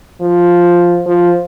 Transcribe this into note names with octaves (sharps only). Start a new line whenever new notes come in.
F3
F3